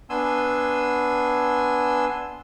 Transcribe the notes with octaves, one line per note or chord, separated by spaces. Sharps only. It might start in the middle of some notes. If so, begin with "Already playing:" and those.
B3 D4 G#5 C6 E6